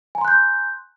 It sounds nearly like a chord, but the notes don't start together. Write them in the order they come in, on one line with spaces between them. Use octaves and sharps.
G#5 A#5 C6 F#6 G6